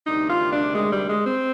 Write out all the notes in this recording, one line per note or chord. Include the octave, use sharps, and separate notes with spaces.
D2 C3 D#3 G3 D#4
F4
D4
G#3
G3
G#3
C4